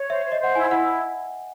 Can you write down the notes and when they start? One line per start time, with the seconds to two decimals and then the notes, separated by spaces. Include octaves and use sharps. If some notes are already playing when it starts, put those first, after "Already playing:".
Already playing: C#5
0.09 C5 E5
0.25 C5
0.32 D#5
0.40 C5 F#5
0.55 E4 G#5
0.70 E4 F#5